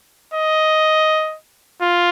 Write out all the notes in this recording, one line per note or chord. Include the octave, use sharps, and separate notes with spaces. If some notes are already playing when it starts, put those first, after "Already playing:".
D#5
F4